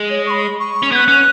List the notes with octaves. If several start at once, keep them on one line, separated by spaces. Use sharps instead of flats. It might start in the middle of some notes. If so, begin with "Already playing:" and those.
Already playing: G#3
C#5
C#6
B5
C#6
C#4
B3 F#6 G#6
C#4